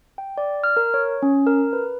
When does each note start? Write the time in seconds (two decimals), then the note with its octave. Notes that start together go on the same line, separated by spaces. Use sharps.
0.18 G5
0.38 D5
0.64 F6
0.77 A#4
0.94 C#5
1.22 C#4
1.47 A#4
1.73 B4